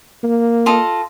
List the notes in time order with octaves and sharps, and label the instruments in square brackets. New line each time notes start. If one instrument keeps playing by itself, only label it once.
[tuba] A#3
[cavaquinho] F4 A4 D#5